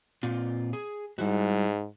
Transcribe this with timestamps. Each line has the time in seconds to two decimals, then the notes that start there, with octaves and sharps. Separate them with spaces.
0.23 A#2 C4 F4
0.73 G#4
1.19 G#2 G3 E4 F#4